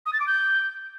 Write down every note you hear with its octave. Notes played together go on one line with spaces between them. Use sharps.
D#6
A6
D6
G6